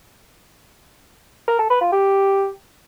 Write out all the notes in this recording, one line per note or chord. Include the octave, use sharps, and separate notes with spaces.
A#4
A4
B4
F4
G4